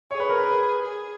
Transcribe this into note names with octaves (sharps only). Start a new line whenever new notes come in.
G#4 C#5
B4
A#4
B4
G#4